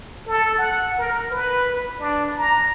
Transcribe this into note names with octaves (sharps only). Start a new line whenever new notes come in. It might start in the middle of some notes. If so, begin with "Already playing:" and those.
A4
F#5
A#4
B4
D4
A#5